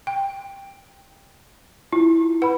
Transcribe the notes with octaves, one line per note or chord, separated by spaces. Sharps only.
G5
E4 F4
B4 F#5 B5